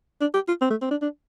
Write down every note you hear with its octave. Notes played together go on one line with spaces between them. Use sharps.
D4
G4
F4
C4
A3
C4
D4
D4